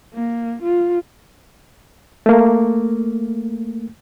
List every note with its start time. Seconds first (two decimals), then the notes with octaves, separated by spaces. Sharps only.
0.14 A#3
0.62 F4
2.26 A3 A#3